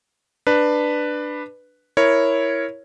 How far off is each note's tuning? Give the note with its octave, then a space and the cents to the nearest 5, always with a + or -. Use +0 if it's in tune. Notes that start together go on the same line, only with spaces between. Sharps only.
D4 +15 B4 +0
E4 +0 A#4 +0 C#5 +0